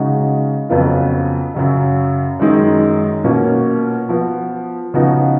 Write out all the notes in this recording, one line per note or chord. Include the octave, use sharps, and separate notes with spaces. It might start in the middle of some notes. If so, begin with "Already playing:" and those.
Already playing: C#3 G#3 D#4 F#4
F2 C#3 F#3 B3 F4
F#2 C#3 F#3
F#2 D#3 G#3 D#4
B2 A#3 C#4 F4
F3 B3 F#4
C#3 F3 B3 D#4 F#4